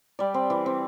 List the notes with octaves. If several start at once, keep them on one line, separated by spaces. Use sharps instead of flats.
G3 D5
C4
E3
C4